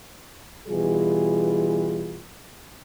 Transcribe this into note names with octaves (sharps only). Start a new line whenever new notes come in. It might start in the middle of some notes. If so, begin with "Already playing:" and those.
B2 E3 G3 F4 G#4